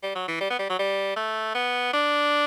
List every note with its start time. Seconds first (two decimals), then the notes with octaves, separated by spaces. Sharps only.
0.03 G3
0.15 F#3
0.28 E3
0.40 G3
0.50 B3
0.59 G3
0.69 F#3
0.79 G3
1.16 A3
1.55 B3
1.93 D4